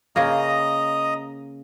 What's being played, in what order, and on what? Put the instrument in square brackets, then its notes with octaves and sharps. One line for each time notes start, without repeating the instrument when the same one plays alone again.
[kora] C#3 A#3 [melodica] D#5 A#5 D#6